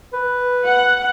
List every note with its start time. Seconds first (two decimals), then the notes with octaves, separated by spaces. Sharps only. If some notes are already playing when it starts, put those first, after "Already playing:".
0.13 B4
0.65 F#5